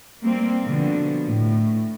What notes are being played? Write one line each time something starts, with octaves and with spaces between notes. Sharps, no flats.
G3 A#3 C4
B2 D3 F3
A2